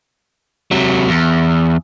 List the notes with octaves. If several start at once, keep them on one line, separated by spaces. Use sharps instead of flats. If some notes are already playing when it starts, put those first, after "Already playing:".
C3 F#3
E2